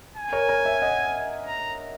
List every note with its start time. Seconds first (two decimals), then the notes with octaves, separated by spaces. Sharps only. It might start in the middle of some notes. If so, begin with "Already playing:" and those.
0.16 G#5
0.33 A#4 C#5
0.49 A#4 C#5
0.65 C#5 E5
0.82 D#5 F#5
1.46 A#5